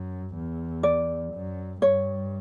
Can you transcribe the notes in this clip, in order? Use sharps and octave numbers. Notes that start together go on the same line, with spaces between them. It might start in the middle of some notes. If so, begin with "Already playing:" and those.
Already playing: F#2
E2
D5
F#2
G2 C#5